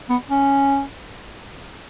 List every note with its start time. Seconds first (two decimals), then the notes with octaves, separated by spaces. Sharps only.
0.09 B3
0.30 C#4